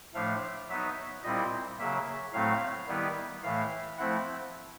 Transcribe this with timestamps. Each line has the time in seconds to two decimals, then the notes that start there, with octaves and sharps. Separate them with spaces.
0.15 A2 F3 A3 D4 F5
0.69 F#3 B3 D#4 E5
1.24 A#2 G3 C4 E4 D#5
1.79 C#3 F#3 A#3 E5
2.33 A2 F#3 A3 C4 F5
2.88 D#3 G3 B3 E4
3.43 A2 E3 A3 F5
3.98 F3 A3 C4 E4 F#5